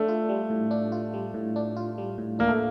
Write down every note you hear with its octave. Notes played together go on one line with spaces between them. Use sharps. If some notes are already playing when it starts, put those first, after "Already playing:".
Already playing: A3 D4
F4
G3
A2
D4
F4
G3
A2
D4
F4
G3
A2
A#3 D4
A3